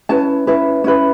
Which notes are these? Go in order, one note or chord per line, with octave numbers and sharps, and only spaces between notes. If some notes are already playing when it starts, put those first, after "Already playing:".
C#4 E4 B4 A5
C#4 E4 B4
C#4 E4 B4